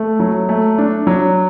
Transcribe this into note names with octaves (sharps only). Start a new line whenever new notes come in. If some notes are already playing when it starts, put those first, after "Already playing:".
Already playing: A3
F#3
A3
D4
F#3